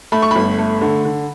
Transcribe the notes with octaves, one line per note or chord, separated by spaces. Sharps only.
A3 B5
C#6
G1 B5
A3
D3
D3